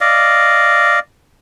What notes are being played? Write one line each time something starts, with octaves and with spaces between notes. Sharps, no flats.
D5 D#5 F5